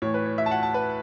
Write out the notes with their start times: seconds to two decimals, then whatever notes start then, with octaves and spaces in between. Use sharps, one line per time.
0.02 A2 E3 C#5
0.14 B4
0.25 C#5
0.38 E5
0.46 A5
0.51 F#5
0.63 A5
0.74 B4